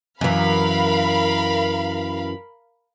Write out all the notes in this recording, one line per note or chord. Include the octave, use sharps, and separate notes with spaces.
F#2 E3 A#4 F5 B5